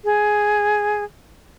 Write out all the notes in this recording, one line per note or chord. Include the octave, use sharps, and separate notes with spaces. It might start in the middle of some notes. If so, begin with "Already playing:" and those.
G#4